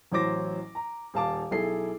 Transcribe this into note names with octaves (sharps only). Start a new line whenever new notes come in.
A1 E3 F#3 C5 D6 A#6
A#5
D#1 F5 A5 D6
B1 E4 G#4 A4 C7